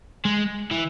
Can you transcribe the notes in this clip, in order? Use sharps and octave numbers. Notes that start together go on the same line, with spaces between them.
G#3
E3